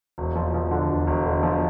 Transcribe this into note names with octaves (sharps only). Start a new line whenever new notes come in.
E1
F3
F3
D3
E1
E1
D3
F3